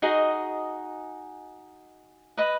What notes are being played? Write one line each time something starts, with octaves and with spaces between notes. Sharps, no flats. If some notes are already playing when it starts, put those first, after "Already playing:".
D#4 F#4 G#4 D#5
B4 D#5 B5